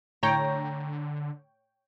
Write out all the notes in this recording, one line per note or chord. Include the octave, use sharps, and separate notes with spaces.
A2 D3 C#5 G5 A#5